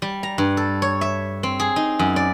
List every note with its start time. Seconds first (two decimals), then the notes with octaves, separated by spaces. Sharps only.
0.02 G3
0.23 A#5
0.38 G2
0.57 A4
0.82 C#5
1.01 E5
1.43 C4
1.60 G#4
1.76 D#4
1.99 F#2
2.16 D5